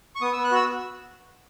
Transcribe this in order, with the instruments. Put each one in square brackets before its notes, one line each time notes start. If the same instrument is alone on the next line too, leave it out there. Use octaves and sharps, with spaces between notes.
[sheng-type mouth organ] C#6
B3 D#6
B3 E6
F#6
F#4 E6